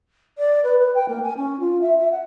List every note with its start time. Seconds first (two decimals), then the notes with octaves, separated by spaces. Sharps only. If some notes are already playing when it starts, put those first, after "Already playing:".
0.38 D5
0.63 B4
0.79 B4
0.95 G5
1.08 A#3
1.23 G#5
1.37 C#4
1.60 F4
1.81 E5
1.98 E5
2.12 F#5